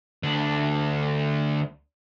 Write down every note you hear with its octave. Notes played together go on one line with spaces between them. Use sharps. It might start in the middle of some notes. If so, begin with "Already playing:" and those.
D2 D4